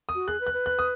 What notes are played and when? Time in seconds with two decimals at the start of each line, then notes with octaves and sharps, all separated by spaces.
0.09 D#6
0.15 F#4
0.28 G#4 F#6
0.41 B4
0.47 F#6
0.54 B4
0.66 F#6
0.79 D#6